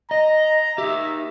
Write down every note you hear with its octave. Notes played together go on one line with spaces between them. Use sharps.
D#5 A#5
D#4 G4 E5